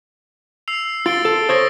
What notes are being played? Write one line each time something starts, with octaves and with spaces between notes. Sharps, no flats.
E6 C7 F7
F4 A6 D7 G7
A4
C5 C#5 D#6 A#6